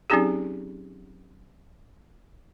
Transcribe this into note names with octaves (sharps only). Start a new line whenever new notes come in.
F#3 C4 C#4 D#4 G4 G#4